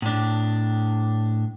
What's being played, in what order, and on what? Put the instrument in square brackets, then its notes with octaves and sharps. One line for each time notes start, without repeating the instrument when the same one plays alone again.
[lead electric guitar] A2 D4